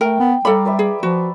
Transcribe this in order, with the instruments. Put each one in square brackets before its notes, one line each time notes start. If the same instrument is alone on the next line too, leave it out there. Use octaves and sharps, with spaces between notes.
[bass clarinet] A3 [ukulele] A#4 [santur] G5
[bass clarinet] B3
[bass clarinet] G3 [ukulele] A4 B5 [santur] D5 F5 A#5
[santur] B4 D5 E5
[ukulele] G#4
[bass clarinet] F3 [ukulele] F#4